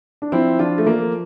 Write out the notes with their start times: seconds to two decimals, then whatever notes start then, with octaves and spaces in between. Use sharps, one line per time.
0.22 D4
0.32 F3 C4 E4
0.59 F3 D4 F4
0.78 A3
0.87 F3 A#3